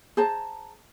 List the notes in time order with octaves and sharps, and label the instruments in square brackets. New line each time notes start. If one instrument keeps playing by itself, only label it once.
[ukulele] G#4 C5 A5 A#5